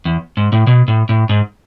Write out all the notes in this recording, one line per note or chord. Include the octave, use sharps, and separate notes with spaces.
E2
G#2
A2
B2
A2
A2
G#2